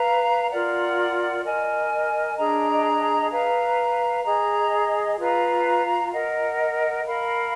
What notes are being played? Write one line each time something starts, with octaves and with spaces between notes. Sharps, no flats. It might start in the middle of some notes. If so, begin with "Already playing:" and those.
Already playing: B4 F5 A#5
F4 A#4 D5 F#5
A#4 D#5 G#5
D4 G#4 D#5 A#5
B4 F5 A#5
G#4 D#5 A#5
F4 B4 F5 A#5
A#4 D#5 F#5
A#4 F5 B5